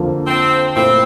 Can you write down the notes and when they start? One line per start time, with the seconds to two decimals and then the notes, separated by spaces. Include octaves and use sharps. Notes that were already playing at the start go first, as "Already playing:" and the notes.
Already playing: F2 D3 F3 A#3
0.27 C4
0.76 A#2 A3 C4 E4 A4 C5